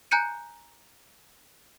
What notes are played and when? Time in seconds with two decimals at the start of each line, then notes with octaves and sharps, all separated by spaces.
0.11 G#5 A#5 F#6 G6 C#7 D#7